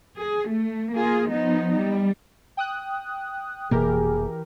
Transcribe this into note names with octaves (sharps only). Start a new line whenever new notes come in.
G#4
A3
A#3 F4 G#4
F3 B3 D#4
G3
G5 D#6 F#6
F1 B2 E3 A#3 G4 G#4 A#4